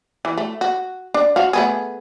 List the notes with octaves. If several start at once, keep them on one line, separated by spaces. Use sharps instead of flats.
E3
A3
F#4
D4
F#4 F5
A3 B3 G#4